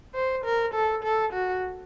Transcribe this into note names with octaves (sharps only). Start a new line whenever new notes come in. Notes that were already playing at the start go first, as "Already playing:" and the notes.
C5
A#4
A4
A4
F#4